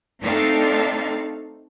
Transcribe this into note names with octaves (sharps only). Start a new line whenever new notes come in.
A3 C4 D4 D#4 A4 F5